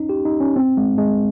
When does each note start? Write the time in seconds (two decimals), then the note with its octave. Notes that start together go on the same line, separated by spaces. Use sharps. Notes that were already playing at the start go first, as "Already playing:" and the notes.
Already playing: C#4 D#4
0.09 G4
0.25 D#4
0.40 C#4
0.56 C4
0.77 G#3
0.98 G#3